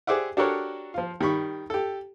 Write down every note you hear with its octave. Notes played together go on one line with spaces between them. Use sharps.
G4 G#4 C5 D5 E5 F#5
D4 F#4 G4 A4 A#4 C#5
F3 F4
D#3 G3 B5 C#6
G4 A4